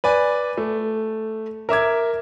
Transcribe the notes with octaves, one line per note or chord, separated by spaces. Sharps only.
B4 D5 G#5
A3
A#4 E5 D6 G#6